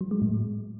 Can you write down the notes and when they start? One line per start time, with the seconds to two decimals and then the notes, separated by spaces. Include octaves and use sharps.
0.01 F#3
0.11 G#3
0.22 A2